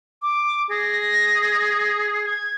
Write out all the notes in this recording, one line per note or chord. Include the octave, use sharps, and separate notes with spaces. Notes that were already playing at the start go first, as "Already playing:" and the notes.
D6
G#4 A#6
G#6